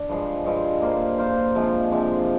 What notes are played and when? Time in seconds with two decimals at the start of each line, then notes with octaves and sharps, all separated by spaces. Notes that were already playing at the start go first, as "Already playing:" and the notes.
Already playing: D4
0.09 G2 F3 G#3
0.45 G2 F3 G#3
0.81 A#3 F4 C5
1.18 A#3 F4 C5
1.55 C3 F3 G#3 D4
1.92 C3 F3 G#3 D4